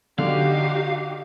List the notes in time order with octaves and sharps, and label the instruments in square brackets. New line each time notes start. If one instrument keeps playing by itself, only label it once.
[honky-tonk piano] D3 [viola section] D#4 F#4 G4 [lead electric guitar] F5